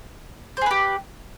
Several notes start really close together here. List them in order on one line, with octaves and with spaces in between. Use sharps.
C5 G#4 B4 G4